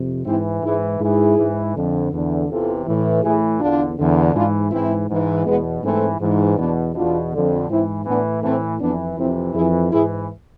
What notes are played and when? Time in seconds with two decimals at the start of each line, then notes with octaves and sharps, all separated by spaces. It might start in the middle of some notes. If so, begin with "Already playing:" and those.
Already playing: F2 C3
0.25 G#2 E3 C4 E4
0.63 G#2 E3 E4 G#4
1.00 G#2 E3 E4 G#4
1.38 G#2 E3
1.74 F2 D3
2.12 E2 D3
2.49 E2 C3 E3 F4 A4
2.86 A2 E3
3.23 A2 E3 E4 G#4
3.60 E2 D3 D4 F4
3.98 E2 D3
4.35 G#2 E3 D4 F4
4.72 G#2 E3 C4 E4
5.10 G#2 E3
5.46 E2 B2 G#3 B3
5.83 G#2 E3 A3 C4
6.20 G#2 E3
6.58 E2 B2 B3 D4
6.94 E2 B2 D4 F4
7.32 F2 D3
7.69 G#2 E3 C4 E4
8.06 A2 E3 B3 D4
8.43 A2 E3 A3 C4
8.81 F2 E3 B3 D4
9.18 F2 C3 E3 C4 E4
9.54 F2 E4 G#4
9.60 E3
9.92 G#2 E3 E4 G#4